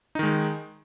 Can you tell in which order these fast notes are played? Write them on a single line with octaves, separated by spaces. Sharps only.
D#4 D#3 G#3